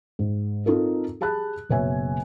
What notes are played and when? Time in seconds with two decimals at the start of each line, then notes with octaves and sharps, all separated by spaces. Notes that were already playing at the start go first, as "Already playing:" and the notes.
0.19 G#2
0.66 C4 D#4 F4 A4 A#4
1.21 G4 G#4 A5 B5 F#6
1.69 F#1 B2 B4 C#5 E5 G#5